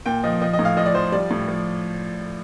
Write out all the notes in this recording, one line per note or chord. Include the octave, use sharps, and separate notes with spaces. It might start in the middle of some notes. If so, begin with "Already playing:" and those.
A#2 G5
F3 D#5
F3 D#5
D#5
A2
F5
F3 D#5
D5
F3 C5
G3 D5
A2
F3